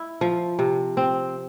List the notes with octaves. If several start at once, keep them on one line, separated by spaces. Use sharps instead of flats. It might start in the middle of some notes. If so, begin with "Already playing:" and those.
Already playing: E4
F3
C3
C4